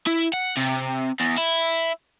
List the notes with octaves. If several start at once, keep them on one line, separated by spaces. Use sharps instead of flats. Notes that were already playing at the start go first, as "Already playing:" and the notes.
E4
F#5
C3
E2
E4